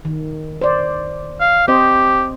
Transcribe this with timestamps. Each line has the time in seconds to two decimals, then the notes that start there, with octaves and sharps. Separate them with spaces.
0.05 D#3
0.61 C5 D5
1.41 F5
1.68 C4 G4 C5 D#5